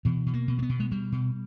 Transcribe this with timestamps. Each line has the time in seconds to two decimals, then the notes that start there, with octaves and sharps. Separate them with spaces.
0.05 B2 E3
0.26 B2
0.34 A#3
0.48 B2
0.59 A#3
0.62 B3
0.69 B2
0.80 G#3
0.91 B2 G3
1.12 B2